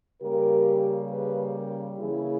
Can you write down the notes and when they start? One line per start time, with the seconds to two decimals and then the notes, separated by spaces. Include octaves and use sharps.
0.22 C#3 G3 A#3 G4 A#4
1.11 G#4 B4
1.55 G4 A#4
1.99 C#3 E3 A#3 E4 G#4